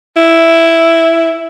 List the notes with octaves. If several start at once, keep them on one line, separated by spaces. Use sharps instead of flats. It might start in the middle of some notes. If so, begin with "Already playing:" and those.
E4